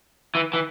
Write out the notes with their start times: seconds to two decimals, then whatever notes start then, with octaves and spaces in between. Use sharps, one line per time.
0.35 E3
0.54 E3